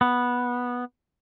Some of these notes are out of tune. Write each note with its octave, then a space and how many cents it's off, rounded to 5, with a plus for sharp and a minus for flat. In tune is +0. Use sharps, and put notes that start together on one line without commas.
B3 -10